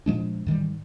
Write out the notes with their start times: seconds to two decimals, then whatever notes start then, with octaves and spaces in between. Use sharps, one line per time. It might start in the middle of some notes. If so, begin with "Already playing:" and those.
0.06 A#2 F3 G#3 D4
0.47 G#2 D#3 E3 G3